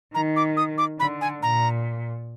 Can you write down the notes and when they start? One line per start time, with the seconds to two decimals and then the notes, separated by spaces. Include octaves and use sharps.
0.14 D#3 A#5
0.36 D6
0.57 D#6
0.78 D6
0.99 D3 B5
1.21 G#5
1.43 A#2 A#5